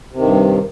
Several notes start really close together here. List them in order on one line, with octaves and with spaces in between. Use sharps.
C3 D#3 G2